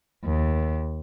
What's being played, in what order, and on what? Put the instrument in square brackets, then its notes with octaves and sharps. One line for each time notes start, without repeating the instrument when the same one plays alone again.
[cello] D#2